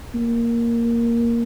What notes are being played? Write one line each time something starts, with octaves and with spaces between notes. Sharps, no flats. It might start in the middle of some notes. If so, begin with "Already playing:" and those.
A#3